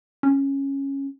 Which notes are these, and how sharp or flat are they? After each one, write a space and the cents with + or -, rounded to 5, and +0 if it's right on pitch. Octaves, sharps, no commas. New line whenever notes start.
C#4 -10